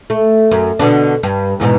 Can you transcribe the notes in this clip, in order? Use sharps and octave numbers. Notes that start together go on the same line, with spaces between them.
A3
F#2
B2 D3 D4
G2
E2 G#2 B2